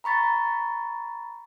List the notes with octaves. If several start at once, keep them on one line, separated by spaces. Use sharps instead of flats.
A#5 B5 C#6 A6 B6